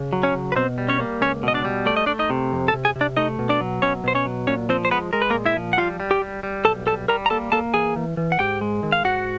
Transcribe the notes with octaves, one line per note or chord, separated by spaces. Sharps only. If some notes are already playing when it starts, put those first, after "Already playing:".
Already playing: C#3
F#3
C#4 C#5
C#3
B4
B2 C4 C5
G3
C#4 C#5
A#3
C#2 C#4 C#5
B2 D#5
D4 D5
G3
A3 D5
D#5
A3 D4 D5
D#4 D#5
C3
F2
A4 A5
C3
G#4 G#5
C3
D4 D5
A3 D#4 D#5
B2
D4 D5
F#3
B2 C#4 C#5
B2 C5
C#4 C#5
F#3
A#2 C#4 C#5
F3 C4 C5
C5
G#3 B3 B4
G#3 A#4
B4
A#3 A#4
A#2
E4 E5
F3
F#5
G3 F4 F5
G3
G4 G5
G3
G3
B1 A4 A5
G3 A4 A5
G3 A#4 A#5
A#5
A#3 A4 A5
A#3 A4 A5
E3 G#4 G#5
E3
E3
F#5
G#2 G4 G5
G#3
D#3
F5
G#2 F#4 F#5